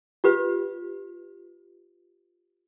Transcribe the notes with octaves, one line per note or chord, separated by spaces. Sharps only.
F4 G4 B4